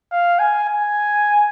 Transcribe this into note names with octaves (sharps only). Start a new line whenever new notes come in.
F5
G#5
G#5